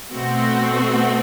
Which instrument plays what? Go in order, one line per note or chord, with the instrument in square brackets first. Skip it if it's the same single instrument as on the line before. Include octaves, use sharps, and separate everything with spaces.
[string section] B2 A3 C4 F#4